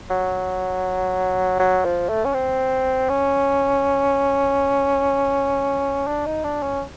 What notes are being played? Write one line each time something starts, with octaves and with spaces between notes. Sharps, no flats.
F#3
F#3
F3
A3
C#4
C4
C#4
D4
D#4
D4
C#4